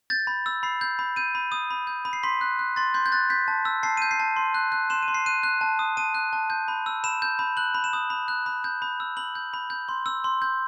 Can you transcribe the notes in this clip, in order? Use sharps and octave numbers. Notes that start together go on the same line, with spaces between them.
G6 A6
B5
E6
B5 C7
G6
B5
G6 D#7
B5
D#6
B5
G6
B5
C7
C6 B6
F#6
F#6
C6 A6
C6 G6
G6
F#6 A6
G6 B6
A5
E6
A5 C7
G6 D#7
C7
A5
C6
F#6
F#6
C6 E7
D#7
C6
C7
F#6 D#7
F#6
A5
D#6
A5 D#7
F#6
A5
G6
B5
E6
B5 E7
G6
B5
F#6 F#7
B5
E7
D#6
B5
F#6
B5
G6
B5
E6
B5 F#7
G6
B5
G6
C6
E6
C6
G6